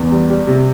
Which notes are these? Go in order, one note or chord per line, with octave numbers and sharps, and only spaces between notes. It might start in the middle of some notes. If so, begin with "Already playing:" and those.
Already playing: E2
G3
G3
C3